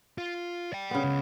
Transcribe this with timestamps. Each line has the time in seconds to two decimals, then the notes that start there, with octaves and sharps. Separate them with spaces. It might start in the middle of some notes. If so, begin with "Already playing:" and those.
0.18 F4
0.73 D5 G5
0.91 C#3 B3
1.04 C#2